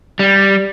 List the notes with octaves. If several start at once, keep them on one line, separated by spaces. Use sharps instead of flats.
G3